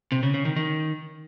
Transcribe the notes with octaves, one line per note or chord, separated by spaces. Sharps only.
C3
C#3
C#3
D#3
D#3